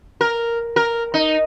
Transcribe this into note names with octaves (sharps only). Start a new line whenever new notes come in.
A#4
A#4
D#4